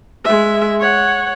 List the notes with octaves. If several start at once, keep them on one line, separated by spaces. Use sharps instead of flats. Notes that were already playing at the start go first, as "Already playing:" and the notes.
G#3 E5
C#5 F#5